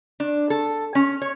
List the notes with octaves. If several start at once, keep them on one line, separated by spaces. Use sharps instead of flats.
D4
A4
C#4
C#5